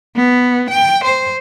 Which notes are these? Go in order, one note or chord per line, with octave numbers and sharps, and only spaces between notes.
B3
G5
C5